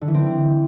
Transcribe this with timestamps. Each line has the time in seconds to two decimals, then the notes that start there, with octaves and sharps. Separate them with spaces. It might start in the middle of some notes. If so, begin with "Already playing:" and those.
0.01 D3
0.08 E3
0.14 C4